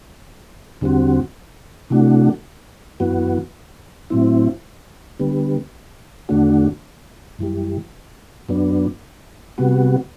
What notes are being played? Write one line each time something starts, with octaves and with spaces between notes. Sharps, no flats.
E2 D3 G3 C4 F#4
C3 E3 A3 D4 F#4
F#2 E3 B3 F#4
A2 F#3 C4 E4
D3 G3 B3
E2 D3 A3 D4 F#4
F#2 E3 G3
F#2 F#3 B3 D4
C3 G3 B3 F#4